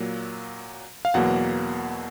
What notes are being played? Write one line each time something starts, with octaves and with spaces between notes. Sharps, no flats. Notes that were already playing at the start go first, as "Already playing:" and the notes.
Already playing: A#2 F#3 A#3
F5
E2 B2 F#3 A#3 F#5